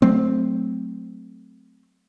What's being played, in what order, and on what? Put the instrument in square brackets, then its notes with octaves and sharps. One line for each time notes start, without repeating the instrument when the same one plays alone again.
[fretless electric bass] F#3 A3 C4